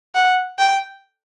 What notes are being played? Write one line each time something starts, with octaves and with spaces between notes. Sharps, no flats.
F#5
G5